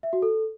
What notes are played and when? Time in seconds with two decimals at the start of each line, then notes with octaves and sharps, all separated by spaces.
0.03 E5
0.13 F#4
0.22 A4